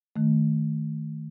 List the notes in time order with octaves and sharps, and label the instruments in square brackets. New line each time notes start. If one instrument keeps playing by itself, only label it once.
[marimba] D#3 A3